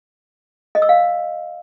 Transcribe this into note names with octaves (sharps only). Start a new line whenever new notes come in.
D#5
E6
F5